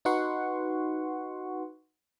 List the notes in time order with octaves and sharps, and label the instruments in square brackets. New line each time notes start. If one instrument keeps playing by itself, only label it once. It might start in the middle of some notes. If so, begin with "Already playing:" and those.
[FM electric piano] D#4 F#4 B4 F#5 C6 C#6